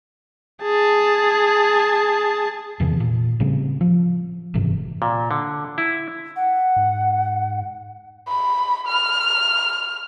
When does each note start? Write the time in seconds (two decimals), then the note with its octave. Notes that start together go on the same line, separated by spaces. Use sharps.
0.63 G#4 A5
2.80 E2 C3 D#3 E3
3.00 A#2
3.40 A2 C#3 G3 C4
3.81 F3
4.54 F#1 G#2 C3 E3
5.02 A#2
5.31 D3
5.78 E4
6.36 F#5
6.76 G#2
8.28 B5
8.87 F6